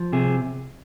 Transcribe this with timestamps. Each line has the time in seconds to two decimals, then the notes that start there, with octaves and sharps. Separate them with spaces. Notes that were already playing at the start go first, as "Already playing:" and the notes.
Already playing: F3
0.13 C3 G#4